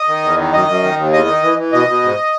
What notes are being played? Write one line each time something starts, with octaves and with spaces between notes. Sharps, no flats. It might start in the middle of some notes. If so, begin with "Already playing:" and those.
Already playing: D#5
D#3
E2
D#3
F#2 D#5
F#2
D#3
D#2
E2 D#5
D#3
E3
E3
B2 D#5
B2
G#2